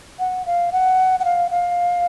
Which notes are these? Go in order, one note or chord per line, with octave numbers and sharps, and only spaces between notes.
F#5
F5
F#5
F#5
F5
F5